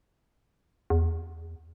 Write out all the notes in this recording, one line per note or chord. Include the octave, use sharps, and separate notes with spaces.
E2